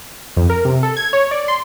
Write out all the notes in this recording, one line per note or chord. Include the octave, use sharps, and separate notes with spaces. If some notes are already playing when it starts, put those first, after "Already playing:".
F2
A#4
C3
A4
G#6
C#5
D5
C6